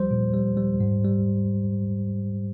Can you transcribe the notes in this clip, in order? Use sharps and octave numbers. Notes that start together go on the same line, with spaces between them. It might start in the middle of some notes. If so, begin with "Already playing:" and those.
Already playing: F3 G3 C5
A#2
G3
G3
G#2
G3